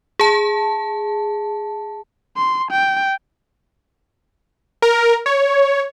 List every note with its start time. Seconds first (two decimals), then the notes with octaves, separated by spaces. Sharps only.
0.19 G#4 A5
2.37 C6
2.71 G5
4.82 A#4
5.26 C#5